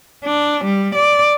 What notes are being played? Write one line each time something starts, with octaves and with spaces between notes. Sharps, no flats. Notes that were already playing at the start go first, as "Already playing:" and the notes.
D4
G3
D5